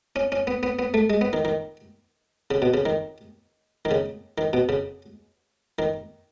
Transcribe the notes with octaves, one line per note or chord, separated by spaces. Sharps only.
C#4
C#4
B3
B3
B3
A3
G#3
B3
D#3
D#3
C#3
B2
C#3
D#3
D#3
C#3
D#3
B2
C#3
D#3